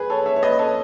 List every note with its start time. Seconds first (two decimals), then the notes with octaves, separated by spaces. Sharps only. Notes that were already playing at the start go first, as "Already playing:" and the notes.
Already playing: G#4 B4
0.10 A4 C#5
0.26 C#5 E5
0.36 C#5
0.42 B4 D#5
0.59 A4 C#5